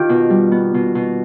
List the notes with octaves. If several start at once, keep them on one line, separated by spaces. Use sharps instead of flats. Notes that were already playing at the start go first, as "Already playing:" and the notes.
Already playing: D#3 F4 G4
B2
G3
B3
B2
B2